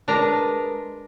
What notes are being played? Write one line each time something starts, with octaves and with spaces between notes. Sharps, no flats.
G#3 D4 A#4 B4 A#5